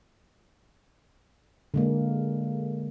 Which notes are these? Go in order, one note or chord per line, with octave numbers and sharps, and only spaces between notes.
D3 G#3 A#3